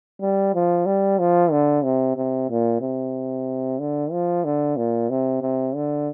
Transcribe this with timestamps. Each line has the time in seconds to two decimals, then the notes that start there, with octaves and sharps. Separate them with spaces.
0.21 G3
0.55 F3
0.86 G3
1.19 F3
1.51 D3
1.84 C3
2.17 C3
2.50 A#2
2.81 C3
3.79 D3
4.12 F3
4.45 D3
4.77 A#2
5.10 C3
5.42 C3
5.75 D3